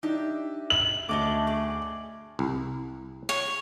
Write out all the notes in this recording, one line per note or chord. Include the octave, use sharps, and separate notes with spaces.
D4 D#4 G4 E5
F#7
D2 A3 C#4 D4 D#5 D6 G7
G#4 D5
C2
C#5